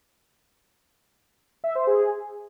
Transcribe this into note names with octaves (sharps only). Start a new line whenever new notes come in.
E5
C5
G#4